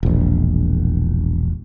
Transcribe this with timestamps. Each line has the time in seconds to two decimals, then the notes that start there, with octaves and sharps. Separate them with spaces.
0.03 E1 A#1